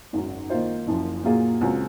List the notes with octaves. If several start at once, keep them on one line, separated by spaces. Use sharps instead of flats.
G#1 F#2 C#3 F#3
D#3 A#3 F4 C5
F#1 F#2 F3
A#2 F#3 A#3 F4 G#4
C#2 C#3 F#3 C4